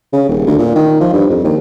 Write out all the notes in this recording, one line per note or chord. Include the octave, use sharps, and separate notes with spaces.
C#3
D#1
D2
A#2
D#3
F3
G2
F2
D#2